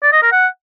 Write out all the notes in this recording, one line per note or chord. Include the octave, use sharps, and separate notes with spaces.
D5
D#5
A#4
F#5